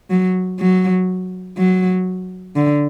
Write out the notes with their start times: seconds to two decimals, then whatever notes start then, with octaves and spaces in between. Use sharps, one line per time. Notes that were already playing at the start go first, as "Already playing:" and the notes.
0.10 F#3
0.60 F#3
1.57 F#3
2.56 D3